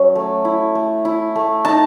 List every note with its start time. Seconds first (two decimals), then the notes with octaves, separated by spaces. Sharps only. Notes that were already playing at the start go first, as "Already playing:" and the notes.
Already playing: F#3 C#4
0.15 A3
0.45 E4
0.75 A3
1.05 E4
1.36 A3
1.65 D#4 A5